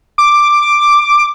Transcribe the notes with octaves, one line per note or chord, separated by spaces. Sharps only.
D6